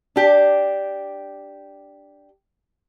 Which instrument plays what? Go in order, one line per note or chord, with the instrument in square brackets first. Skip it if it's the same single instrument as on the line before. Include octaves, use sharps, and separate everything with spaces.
[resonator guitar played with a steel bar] D4 G4